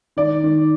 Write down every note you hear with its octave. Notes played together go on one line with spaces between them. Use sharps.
D#3 D5
D#3